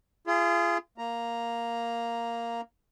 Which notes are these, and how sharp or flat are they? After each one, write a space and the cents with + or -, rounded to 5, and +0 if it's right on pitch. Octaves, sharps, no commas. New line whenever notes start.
F4 -35 G#4 +0
A#3 +0 A#5 +0